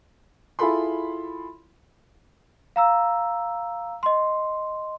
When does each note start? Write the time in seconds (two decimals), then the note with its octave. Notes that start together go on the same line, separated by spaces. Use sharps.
0.59 E4 F4 G#4 A4 B5 C6
2.76 F5 A#5 E6
4.03 D#5 C6